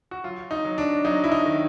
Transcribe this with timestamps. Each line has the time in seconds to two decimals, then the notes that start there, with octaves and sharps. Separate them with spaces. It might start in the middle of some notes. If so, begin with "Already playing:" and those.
0.11 F#4
0.24 F#3 F4
0.51 D#4
0.65 F#3
0.78 D4
1.04 F#3 D#4
1.24 E4
1.32 D#4
1.46 D#3